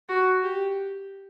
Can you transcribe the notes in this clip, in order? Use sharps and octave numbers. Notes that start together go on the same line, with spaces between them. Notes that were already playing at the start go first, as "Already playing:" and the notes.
F#4
G4